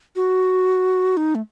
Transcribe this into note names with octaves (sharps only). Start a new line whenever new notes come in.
F#4
D#4
A3